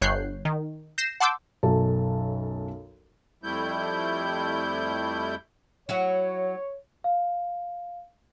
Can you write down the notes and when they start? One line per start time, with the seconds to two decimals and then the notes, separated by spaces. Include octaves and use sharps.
0.02 G1 C#5 F#6 G6 C7
0.45 D#3
0.98 G6 A#6 C7 E7
1.20 F#5 A5 C6 D6 E6 G6
1.63 B1 F#2 A4 A5
3.43 F2 G3 A3 E4 G6
5.89 F#3 E4 F#4 C#5
7.04 F5